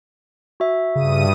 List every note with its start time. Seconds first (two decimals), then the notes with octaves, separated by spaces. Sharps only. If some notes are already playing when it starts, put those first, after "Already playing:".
0.60 F#4 E5
0.95 G2 C#3 D#6 D#7